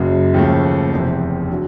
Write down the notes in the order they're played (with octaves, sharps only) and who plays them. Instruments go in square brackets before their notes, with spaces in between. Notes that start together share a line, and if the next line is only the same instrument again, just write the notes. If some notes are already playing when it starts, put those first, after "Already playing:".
Already playing: [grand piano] F#1 F#2 C#3 F#3
D#2 C#3 F3 A3
F1 E2 C3
D3 F#3